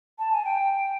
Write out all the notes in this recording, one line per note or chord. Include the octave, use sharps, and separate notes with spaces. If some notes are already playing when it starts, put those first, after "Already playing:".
A5
G#5
G5